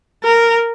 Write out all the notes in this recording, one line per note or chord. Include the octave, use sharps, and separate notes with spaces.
A#4